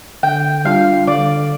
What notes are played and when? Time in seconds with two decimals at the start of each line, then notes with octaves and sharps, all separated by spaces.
0.23 D3 G5
0.65 G3 D4 F4 F5
1.07 D3 D5